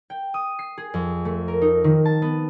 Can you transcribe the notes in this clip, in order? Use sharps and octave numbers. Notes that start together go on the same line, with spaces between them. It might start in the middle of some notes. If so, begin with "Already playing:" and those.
G5
D#6
C7
G#4
F2
A3
A#4
D#4
D#3
A5
B3